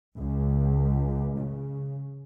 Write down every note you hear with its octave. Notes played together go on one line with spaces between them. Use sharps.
C#2
C#3